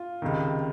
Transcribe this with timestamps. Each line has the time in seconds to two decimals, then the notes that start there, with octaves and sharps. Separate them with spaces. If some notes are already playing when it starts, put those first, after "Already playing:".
Already playing: F4
0.22 C#2 C3 D#3